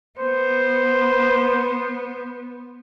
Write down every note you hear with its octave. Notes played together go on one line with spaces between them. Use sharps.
B3 C5